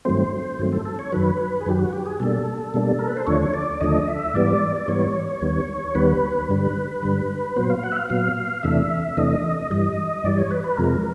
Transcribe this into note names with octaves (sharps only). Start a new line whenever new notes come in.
G2 D#3 F#3 A3 C4 C5
G2 D#3 F#3 A3 C4
A4
A4
C#5
F#2 D#3 F#3 B4
G#4
F#2 D#3 F#3 G4
F#4
G4
G#4
B2 G3 A#3 D4 A4
B2 G3 A#3 D4
A#4
B4
C5
D#2 D3 F3 A3 D4 C#5
D5
D#2 D3 F3 A3 D4 D#5
E5
G#2 E3 G3 B3 D5
D5
G#2 E3 G3 B3 C#5
D#2 D#3 G3 B3
D#2 D#3 G3 B3 B4
G2 D3 G3
G2 D3 G3
A#2 F#3 B3 C5
F5
F#5
E5
F5
A#2 F#3 B3 F5
E2 C3 E3 A3 D4 E5
E2 C3 E3 A3 D4 D#5
G2 E3 G3 D#5
G2 E3 G3 D5
C#5
B4
B4
F2 C3 F3 G#3 A#4